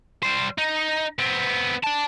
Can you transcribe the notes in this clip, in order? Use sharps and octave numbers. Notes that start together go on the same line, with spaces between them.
G3 C5
D#4
B3 C4
D5 A5